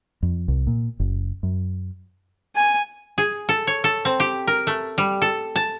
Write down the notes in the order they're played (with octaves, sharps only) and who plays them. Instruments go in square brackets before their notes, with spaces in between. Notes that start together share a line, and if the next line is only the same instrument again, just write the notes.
[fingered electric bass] F2
C2
A#2
F#1
F#2
[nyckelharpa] G#5
[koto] G#4
A4
C#5
A4
C4
G4
A#4
A3
G3
A4
A5